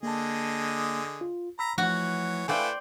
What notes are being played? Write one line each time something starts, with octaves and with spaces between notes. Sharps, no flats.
D3 A#3 G#4 D#5 A5
F4
A#5 B5 E6 B6
E3 F3 A3 F#4 C#5
A3 E4 B4 C5 D5 F5 G5 G#5